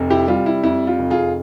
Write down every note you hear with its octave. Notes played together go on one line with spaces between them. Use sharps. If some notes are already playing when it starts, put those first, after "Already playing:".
Already playing: F1 C3
E4 G4
G3 F4
E4
F2 E4
F4
F1
F4 G#4